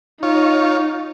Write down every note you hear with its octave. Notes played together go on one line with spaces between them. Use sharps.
D#4 F4 C#5